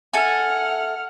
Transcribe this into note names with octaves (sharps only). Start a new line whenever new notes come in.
A4 E5 F#5 G#5 F6